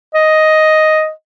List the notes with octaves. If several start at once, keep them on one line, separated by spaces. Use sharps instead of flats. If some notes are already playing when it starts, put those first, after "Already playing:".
D#5